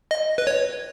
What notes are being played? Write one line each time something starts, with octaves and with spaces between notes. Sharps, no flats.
D#5
B4
C#5